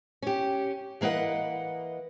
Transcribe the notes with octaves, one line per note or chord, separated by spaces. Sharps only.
C#4 G4
E3 A#3 B4 D#5 F#5